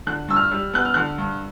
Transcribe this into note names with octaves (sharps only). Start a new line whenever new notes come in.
D3 F#6
G2 E6
F6
G3
B3 F#6
F6
D3 F#6
G2